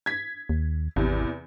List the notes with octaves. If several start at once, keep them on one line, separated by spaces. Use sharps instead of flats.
G#6 B6
D#2
G#1 E2 C3